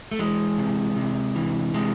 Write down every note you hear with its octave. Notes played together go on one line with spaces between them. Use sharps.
A3
E3 G#3
C3
C3
E3
C3 G#3